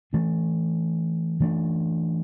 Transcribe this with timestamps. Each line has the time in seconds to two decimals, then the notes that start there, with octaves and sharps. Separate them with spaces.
0.13 E3 A3 D4
1.40 E3 A3 D4